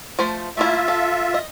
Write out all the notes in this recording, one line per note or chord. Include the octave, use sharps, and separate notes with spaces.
F3 A3 C5
A3 A#3 E4 F4 E5
A4
D#5